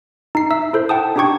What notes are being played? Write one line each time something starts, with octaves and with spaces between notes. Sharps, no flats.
D#4 C7
E5 E6
E4 A4 C5
F#5 G5 A5 D#6
D4 D#4 G4 G5 C#6 G#6